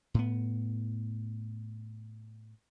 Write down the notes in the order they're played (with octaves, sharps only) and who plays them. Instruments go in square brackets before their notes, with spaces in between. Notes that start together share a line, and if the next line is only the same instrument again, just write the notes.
[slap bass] A2 B3